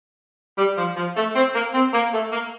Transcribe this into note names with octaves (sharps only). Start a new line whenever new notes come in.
G3
F3
F3
A3
C4
A#3
C4
A#3
A3
A#3